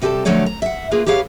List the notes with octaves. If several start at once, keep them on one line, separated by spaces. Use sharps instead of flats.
C3 G3 G4 A4 A5
D3 F3 F#3 A3 C#5 D5
A#5
E5 F#5
A#3 F4 G#4 B4
G4 G#4 B4 C#5 F5